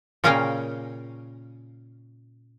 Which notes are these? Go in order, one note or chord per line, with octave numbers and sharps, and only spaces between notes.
A#2 C#3 C#4 A#4 F5 G5